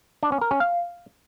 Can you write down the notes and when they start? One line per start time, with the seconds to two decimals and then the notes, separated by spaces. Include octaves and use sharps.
0.23 D4
0.32 C#4
0.41 A#4
0.51 C#4
0.60 F5